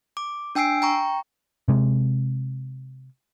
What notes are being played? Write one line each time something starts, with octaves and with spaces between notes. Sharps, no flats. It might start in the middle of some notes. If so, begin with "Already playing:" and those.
D6
D4 G5 G#5 E6 C7 D7
G5 A#5 C#6
C3 G#3